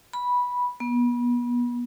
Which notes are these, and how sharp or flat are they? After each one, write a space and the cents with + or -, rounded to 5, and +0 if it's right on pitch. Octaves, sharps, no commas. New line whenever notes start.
B5 -10
B3 -30